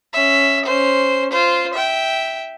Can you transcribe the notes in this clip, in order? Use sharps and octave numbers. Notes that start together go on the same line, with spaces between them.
C#4 E5
C#4 C5
F4 C5
E5 G5